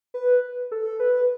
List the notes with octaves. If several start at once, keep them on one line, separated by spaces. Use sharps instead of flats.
B4
A4
B4